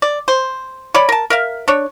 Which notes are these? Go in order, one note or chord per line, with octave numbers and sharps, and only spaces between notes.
D5
C5
C#5 D5 B5
A#4 A5
A#4 E5 F5
D4 C#5